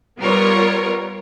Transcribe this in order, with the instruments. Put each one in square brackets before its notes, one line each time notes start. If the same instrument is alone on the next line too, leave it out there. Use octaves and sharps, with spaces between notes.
[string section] G3 B3 F4 A#4 C#5